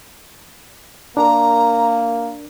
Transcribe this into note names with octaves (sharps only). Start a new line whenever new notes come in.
A#3 D4 A#4 A#5